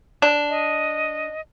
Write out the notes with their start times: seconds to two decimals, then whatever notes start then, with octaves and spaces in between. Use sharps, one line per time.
0.22 D4
0.49 D#5